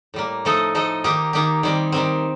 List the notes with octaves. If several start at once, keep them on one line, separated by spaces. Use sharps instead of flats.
A2 G3 A#3
F3 A3 D#4 A4 D#5
F3 A3 D#4 A4 D#5
D#3 A#3 D#4 G4
D#3 A#3 D#4 G4
D#3 G3 C4
D#3 G3 C4